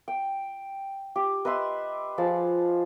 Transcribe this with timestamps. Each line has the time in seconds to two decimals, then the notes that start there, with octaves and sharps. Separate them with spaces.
0.08 G5
1.16 G4
1.45 B4 D#5 E5 C6
2.18 F3 G#4 A5